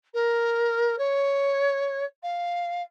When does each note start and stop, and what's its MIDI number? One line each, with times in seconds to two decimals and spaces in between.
0.14 0.95 70
0.98 2.04 73
2.22 2.82 77